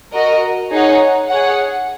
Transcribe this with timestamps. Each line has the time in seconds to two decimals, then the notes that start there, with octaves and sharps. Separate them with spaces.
0.13 F#4 A#4 D#5
0.72 D#4 G#4 C#5 F#5
1.29 G#4 C#5 F#5